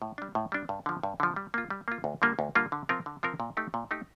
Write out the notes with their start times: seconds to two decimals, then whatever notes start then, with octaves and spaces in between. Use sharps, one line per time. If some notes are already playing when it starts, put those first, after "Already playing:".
0.02 A2
0.18 G3 D4
0.35 A2
0.52 G3 D4
0.69 G2
0.86 D3 F3
1.03 G2
1.20 D3 F3
1.36 G3
1.54 A#3 F4
1.70 G3
1.88 A#3 F4
2.04 D2
2.22 D3 G3 A#3 F4
2.39 D2
2.55 D3 G3 A#3 F4
2.72 D3
2.89 F3 C4 F4 A#4
3.06 D3
3.23 F3 C4 F4 A#4
3.40 A#2
3.57 A3 D#4 G4
3.74 A#2
3.91 A3 D#4 G4